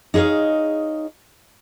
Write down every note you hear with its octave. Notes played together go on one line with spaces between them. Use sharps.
D#4 G#4 C#5 D#5 F5